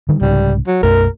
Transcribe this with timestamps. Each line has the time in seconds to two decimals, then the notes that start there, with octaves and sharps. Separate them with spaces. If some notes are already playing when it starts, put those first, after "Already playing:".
0.09 D3 D#3 G3
0.22 C2 G#2 C#3 G3
0.67 F#3
0.83 B1 F#2 A3 A#4